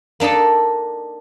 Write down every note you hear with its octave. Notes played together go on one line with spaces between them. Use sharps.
A#3 D4 D#4 A4